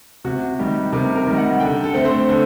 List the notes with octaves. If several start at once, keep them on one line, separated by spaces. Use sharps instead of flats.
C3 F#4
D#3 G3 G4
C3 A#4
A#4
D#3 G3
F#5
D3 G5
A4
A3 C4
C5
D3